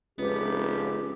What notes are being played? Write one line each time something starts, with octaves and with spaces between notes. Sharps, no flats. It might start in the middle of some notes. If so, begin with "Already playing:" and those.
F1 C#2 B3 G4